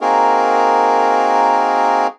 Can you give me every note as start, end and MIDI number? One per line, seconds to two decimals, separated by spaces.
0.01 2.07 58
0.01 2.07 60
0.01 2.07 63
0.01 2.07 66
0.01 2.07 68
0.01 2.07 70